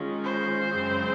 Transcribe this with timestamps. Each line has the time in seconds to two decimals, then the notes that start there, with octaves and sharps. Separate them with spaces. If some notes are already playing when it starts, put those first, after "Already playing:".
Already playing: D#3 G#3 C#4 F4
0.24 C5
0.71 F#2 C#3 G#3 C4